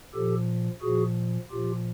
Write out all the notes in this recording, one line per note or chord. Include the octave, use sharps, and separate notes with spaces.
A#2 F3 G4 A4
A#2 F3 F#4 G#4
A#2 F3 F4 G4